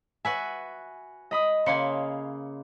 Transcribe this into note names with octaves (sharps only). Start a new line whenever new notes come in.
F#4 B4 E5 G#5
D#5 B5 D#6
C#3 A#3 G#5 B5 C6 C#7